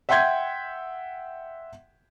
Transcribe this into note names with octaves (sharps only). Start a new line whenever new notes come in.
E5 F#5 G5 C6 G6 G#6